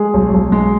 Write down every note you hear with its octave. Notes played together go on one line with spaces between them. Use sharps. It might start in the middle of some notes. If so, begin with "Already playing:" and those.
Already playing: G#3 G#4
B1
B1
G#3